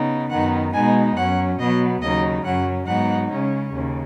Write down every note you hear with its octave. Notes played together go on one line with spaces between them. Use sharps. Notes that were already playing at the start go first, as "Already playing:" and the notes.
Already playing: C#3 B3 D#4
F#2 D#3 B3 D#4 F#5
B2 G#3 B3 D#4 G#5
F#2 F#3 C#4 F#5
B2 F#3 B3 D#5
D#2 C#3 F#3 D#4 D#5
F#2 F#3 C#4 F#5
G#2 F#3 B3 D#4 F#5
C#3 G#3 C#4
D#2 C#3